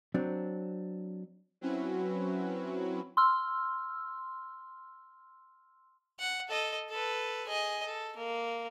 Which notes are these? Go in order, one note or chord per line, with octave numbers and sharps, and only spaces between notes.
F#3 C4 D4
F#3 C4 C#4 E4 F#4 B4
C6 E6 F6
F#5
A4 D#5
A4 B4
G#4 D#5
A4
A#3